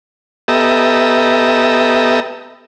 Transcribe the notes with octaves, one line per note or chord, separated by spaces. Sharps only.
B3 G4 A4 D#5 E5 A#5